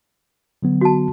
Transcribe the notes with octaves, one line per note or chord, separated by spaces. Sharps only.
D3 F#3 B3
F#4 A5